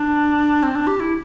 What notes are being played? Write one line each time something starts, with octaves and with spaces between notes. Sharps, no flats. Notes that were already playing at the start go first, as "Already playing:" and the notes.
Already playing: D4
C4
D4
G4
E4